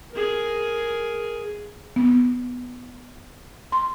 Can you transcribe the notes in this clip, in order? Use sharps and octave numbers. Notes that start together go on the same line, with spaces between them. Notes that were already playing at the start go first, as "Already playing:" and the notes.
G#4 A#4
B3
C6